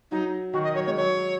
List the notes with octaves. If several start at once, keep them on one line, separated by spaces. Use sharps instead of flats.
F#3 D#4
D#3 F#4
D#5
F#3 C#5
G#3 C#5
F#3 C#5